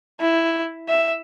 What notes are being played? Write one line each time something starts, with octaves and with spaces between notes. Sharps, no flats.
E4
E5